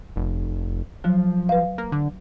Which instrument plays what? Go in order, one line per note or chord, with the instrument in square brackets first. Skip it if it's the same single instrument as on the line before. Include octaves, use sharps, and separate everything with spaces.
[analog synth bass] F1
[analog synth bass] F3 [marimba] F#3
[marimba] B4 F5
[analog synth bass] A#3
D3